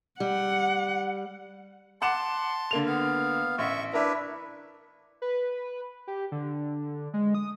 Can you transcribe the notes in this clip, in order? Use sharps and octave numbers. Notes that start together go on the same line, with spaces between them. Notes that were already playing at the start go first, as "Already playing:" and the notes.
G3 F#5
F#5 A5 C6 D6 E7
D3 A#3 F7
B3 F5
A1 E5 C#6
D4 E4 A#4 B4 E5
B4
G4
D3
G#3
D#6